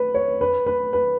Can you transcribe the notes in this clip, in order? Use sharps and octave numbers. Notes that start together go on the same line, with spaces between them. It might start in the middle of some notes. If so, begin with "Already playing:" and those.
Already playing: B4
C#5
B4
B4
B4